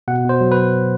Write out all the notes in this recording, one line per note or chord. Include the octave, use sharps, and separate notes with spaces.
B2 F#5
B2
C5
F#3
B4